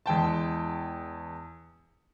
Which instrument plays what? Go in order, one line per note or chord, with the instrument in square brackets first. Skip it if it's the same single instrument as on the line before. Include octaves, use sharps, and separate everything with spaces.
[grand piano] E2 G#3 G5 A5